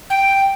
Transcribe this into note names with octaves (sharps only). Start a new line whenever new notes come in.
G5